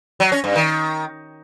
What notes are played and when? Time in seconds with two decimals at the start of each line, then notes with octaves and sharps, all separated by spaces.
0.20 F#3
0.32 C#4
0.44 G2
0.56 D#3